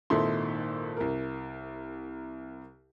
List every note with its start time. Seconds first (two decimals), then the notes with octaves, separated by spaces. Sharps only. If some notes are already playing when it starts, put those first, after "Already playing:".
0.10 G#1 A#2 D#4 E4 A4 C6
0.97 C2 A#4